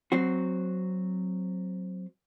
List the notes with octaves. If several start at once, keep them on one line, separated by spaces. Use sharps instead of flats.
F#3 C4 F#4